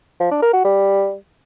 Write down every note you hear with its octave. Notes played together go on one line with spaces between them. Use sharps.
F3
D4
A#4
F#4
G3